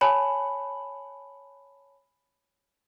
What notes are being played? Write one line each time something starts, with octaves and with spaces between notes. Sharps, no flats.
C#5 G#5 A5 B5